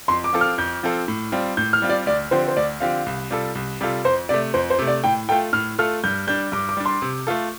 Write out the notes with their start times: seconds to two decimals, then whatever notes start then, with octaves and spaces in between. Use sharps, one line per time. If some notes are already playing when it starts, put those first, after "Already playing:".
0.08 F2 C6
0.24 D6
0.33 F3 C4 F4 A4
0.41 F6
0.58 F2 G6
0.83 F3 C4 F4 A4
1.08 A2
1.32 G3 C4 F4
1.57 A2 G6
1.73 F6
1.82 G3 C4 F4
1.89 D5
2.06 D2 D5
2.31 D3 F3 C4 G4 C5
2.48 C5
2.57 D2 D5
2.80 D3 F3 C4 G4 F5
3.06 C2
3.31 C3 G3 F4 A4
3.55 C2
3.81 C3 G3 F4 A4
4.04 F2 C5
4.29 C3 A3 D5
4.54 F2 C5
4.70 C5
4.79 C3 A3
4.87 D5
5.04 A2 G5
5.29 A3 F4 A4 G5
5.53 A2 F6
5.78 A3 F4 A4 F6
6.04 G2 G6
6.27 G3 D4 G6
6.52 G2 D6
6.69 D6
6.77 G3 D4
6.85 C6
7.02 C3
7.27 A3 F4 A4